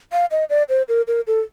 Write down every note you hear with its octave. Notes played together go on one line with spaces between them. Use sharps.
F5
D#5
D5
C5
A#4
A#4
A4